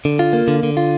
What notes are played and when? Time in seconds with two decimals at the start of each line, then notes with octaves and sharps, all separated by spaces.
0.05 D3
0.19 F4
0.33 A#3
0.48 D3
0.63 D3
0.77 F4